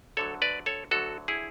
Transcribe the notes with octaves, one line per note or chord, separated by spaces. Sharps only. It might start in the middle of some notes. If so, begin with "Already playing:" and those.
D2 D3 F#3 A4 C#5
B4 D5
A4 C#5
D2 D3 F#3 F#4 A4
E4 G#4